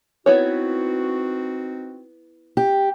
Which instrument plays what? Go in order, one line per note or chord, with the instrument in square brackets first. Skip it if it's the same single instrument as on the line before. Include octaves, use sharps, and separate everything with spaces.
[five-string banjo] B3 E4 C#5 [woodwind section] C4 D#4 F#4
[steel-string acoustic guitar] G4